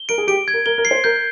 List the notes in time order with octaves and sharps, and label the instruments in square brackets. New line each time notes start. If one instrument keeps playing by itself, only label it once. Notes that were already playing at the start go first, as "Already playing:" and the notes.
Already playing: [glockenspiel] G7
[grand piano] A#4 [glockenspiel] D7
[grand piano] G#4
[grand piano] G4 [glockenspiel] D7
[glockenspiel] G#6
[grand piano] A#4
[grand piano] A#4 [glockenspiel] G7
[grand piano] A#4
[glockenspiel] C7
[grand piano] C5
[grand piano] A#4 [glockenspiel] G6